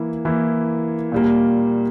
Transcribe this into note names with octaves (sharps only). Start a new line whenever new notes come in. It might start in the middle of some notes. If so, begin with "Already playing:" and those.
Already playing: E3 A#3 E4
E3 A#3 E4
A#2 G3 A#3